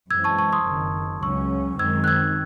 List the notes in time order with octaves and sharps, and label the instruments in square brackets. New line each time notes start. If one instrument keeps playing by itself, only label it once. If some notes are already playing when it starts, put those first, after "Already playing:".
[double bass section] F#2 E3 G#3 C4 [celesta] E6 G#6
[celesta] A5 C#6
A5 C#6
C6 D#6
[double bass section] F#1 F#2 D#3
[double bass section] C#2 C#3 F#3 C#4 [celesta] C#6 E6
[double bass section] F#2 D#3 G#3 C4 [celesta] E6 G#6
[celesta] F#6
E6 G#6